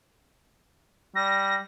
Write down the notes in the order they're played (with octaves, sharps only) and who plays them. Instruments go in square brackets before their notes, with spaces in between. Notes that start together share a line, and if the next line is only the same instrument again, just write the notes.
[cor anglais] G3 [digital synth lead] A#6